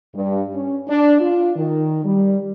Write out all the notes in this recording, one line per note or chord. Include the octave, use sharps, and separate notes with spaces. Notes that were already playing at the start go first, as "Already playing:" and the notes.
G2
C#4
D4
F4
D#3
G3